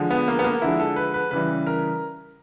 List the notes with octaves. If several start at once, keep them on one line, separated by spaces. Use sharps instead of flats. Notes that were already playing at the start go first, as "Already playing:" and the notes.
Already playing: D3 F3 G#3
B3
A#3
B3
A#3
D3 F3 G#3 E4
A4
B4
B4
C#3 E3 G3 B4
A#4